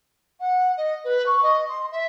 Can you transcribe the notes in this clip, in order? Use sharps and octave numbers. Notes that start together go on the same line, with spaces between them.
F#5
D#5
B4
C#6
D#5
C6
E5